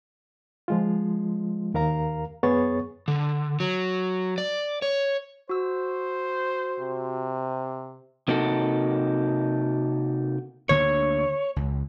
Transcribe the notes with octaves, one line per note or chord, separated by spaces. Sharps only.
F3 G#3 F4
D#2 A#4 F5 A#5
F#2 B3 G#4 C#5 C#6 A6
D3
F#3
D5
C#5
F#4 C5 E6
C3
C3 A#3 D#4 F#4 A4
D2 D3 A#3 C#5
C#2